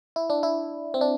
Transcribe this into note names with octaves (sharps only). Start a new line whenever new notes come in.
E4
D4
E4
C4
D4